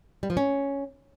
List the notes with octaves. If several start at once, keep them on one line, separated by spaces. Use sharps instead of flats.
G3
F3
C#4